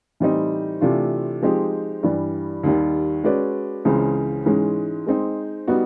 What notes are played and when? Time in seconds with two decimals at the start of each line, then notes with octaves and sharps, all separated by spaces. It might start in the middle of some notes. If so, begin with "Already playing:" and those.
0.20 A2 E3 G3 C4 D#4
0.81 C3 E3 A3 D4 F4
1.42 F3 G#3 C4 D#4 G4
2.03 G2 E3 G3
2.63 D#2 D#3 G3
3.24 G#3 C#4 F#4 B4 D5
3.85 C#2 C#3 E3 G#3 C4
4.46 G#2 E3 G#3 C#4
5.07 G#3 C4 D#4
5.68 G3 B3 D#4 F#4